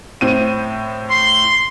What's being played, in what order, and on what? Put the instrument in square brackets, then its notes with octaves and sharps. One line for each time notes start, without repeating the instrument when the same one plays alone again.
[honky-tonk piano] A2 C4 D#7
[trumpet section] C6